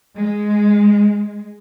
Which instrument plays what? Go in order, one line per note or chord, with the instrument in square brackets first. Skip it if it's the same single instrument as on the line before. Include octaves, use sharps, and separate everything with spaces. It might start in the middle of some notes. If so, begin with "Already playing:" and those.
[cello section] G#3